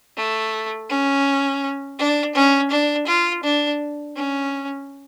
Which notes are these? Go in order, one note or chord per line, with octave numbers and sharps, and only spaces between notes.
A3
C#4
D4
C#4
D4
F4
D4
C#4